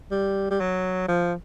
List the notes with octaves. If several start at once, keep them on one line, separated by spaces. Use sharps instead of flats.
G3
G3
F#3
F3